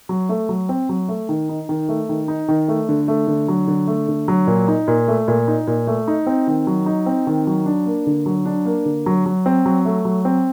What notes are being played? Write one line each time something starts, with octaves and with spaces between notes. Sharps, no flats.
F#3
A3
F#3
C4
F#3
A3
D#3
D#4
D#3
A3
D#3
D#4
D#3
A3
D3
A3
D3
F#3
D3
A3
D3
F#3
A#2
D#4
A#2
A3
A#2
D#4
A#2
A3
D#4
C4
D#3
F#3
D#4
C4
D#3
F#3
D4
A#3
D3
F#3
D4
A#3
D3
F#3
F#3
C4
F#3
A3
F#3
C4